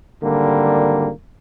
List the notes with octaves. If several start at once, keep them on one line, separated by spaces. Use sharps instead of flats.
G#1 D3 G3 A#3